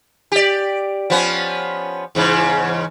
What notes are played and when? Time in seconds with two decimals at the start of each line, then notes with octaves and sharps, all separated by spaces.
0.32 G4 D5
1.10 F3 B3 C#4
2.15 E2 G#2 C#3